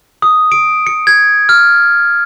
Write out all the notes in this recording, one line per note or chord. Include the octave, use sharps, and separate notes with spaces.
D#6
D7
C#7
G#6
F6